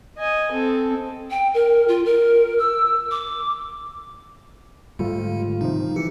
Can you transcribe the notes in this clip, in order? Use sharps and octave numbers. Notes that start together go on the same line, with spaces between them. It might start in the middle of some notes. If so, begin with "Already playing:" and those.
D#5 G#5
C4 A4
G5
A#4
F4
A#4
E6
D6
G#2 D3 G3 A3 F4
C3 D#3 F3 D#4
E3 G4 C#7